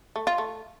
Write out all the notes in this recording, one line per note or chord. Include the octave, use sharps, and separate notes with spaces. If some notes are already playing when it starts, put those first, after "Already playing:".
A3
F4
A3